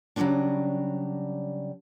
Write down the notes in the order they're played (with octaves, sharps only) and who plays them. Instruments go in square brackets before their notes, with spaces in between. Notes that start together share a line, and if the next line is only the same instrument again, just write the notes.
[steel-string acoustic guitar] C#3 F#3 G3 A#3 C4 D4